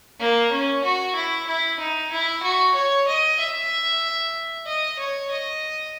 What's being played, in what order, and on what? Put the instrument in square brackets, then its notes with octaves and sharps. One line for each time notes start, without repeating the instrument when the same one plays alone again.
[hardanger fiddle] A#3
C#4
F#4
E4
E4
D#4
E4
F#4
C#5
D#5
E5
D#5
C#5
D#5